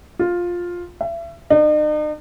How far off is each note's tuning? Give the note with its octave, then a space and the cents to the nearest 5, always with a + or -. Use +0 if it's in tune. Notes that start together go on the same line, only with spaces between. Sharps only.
F4 +10
E5 +35
D#4 -45